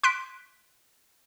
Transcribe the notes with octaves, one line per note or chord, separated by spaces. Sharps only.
C6 F#6 B6 D7